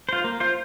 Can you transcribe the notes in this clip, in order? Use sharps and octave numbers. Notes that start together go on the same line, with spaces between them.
F4 C5
A#3
F4 C5